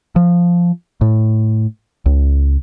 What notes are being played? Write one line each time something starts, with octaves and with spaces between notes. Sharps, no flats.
F3
A2
C#2